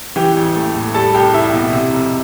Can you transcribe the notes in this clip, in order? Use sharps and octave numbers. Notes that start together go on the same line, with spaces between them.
E3 G4 G5
A1
A3
A2
G3 A4 A5
C2 G4 G5
C2 E4 E5
B2
C3
F1